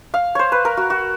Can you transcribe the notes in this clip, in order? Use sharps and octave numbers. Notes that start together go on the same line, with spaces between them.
F5
C5 C#5
B4
A#4
F#4
F#4